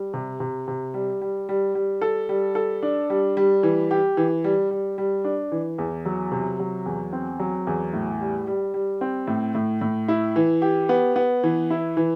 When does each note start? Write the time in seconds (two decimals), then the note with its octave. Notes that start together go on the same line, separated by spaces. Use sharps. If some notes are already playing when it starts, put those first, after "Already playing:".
Already playing: G3
0.14 C3
0.40 C3
0.68 C3
0.94 G3
1.21 G3
1.49 G3
1.75 G3
2.01 A4
2.29 G3
2.55 A4
2.83 D4
3.10 G3
3.37 G3
3.63 E3
3.91 G4
4.17 E3
4.44 G3
4.71 G3
4.98 G3
5.24 D4
5.52 E3
5.78 E2
6.05 F#3
6.32 C3
6.60 F#3
6.86 E2
7.13 C4
7.39 F#3
7.67 E2
7.93 A2
8.20 G3
8.47 G3
8.74 G3
9.01 C4
9.27 A2
9.55 A2
9.81 A2
10.08 E4
10.36 E3
10.62 G4
10.89 B3
11.16 B3
11.43 E3
11.70 E4
11.97 E3